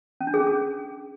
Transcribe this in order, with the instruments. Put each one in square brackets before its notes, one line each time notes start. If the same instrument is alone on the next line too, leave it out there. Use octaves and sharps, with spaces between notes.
[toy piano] C#4
D4
G#4
C#4
G#4